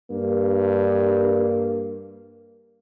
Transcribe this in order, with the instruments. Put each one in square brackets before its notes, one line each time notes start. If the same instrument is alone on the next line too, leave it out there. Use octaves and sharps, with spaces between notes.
[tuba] G2 [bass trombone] A#3